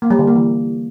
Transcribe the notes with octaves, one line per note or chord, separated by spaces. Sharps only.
A#3
G3
D3
A#3
E3